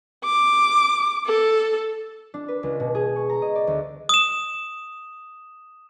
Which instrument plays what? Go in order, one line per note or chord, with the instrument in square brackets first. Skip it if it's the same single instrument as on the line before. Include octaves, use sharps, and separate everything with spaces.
[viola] D6
A4
[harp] D4
B4
C#2
B2
G#4
C#6
A#5
D#5
D5
D2
[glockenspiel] D#6 E7